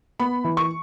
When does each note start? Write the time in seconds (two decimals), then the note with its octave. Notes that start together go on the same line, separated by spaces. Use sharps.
0.20 B3 B5
0.44 E3
0.57 C#6